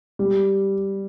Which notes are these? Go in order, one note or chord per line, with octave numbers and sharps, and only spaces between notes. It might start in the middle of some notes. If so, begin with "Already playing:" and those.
G3